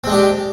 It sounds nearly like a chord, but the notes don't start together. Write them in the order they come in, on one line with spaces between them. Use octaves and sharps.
C4 G#3 D4 G4